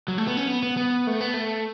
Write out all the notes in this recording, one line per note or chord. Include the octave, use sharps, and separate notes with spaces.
F#3
A3
B3
C#4
B3
B3
B3
A3
B3
A3